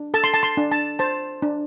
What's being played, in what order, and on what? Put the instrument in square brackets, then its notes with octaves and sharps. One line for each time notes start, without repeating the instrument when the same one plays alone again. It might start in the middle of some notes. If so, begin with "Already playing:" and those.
Already playing: [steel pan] D4
A4 A5
C6
A5
C6
D4
A5
C5 A5
D4